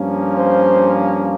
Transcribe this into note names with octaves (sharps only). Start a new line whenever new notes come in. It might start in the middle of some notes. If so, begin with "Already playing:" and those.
Already playing: G2 F3 A#3 C#4
C5